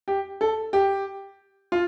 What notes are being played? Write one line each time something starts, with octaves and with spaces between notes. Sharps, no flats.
G4
A4
G4
F4